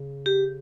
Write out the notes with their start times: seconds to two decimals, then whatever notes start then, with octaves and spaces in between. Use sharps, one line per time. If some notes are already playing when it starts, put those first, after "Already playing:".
Already playing: C#3
0.26 G4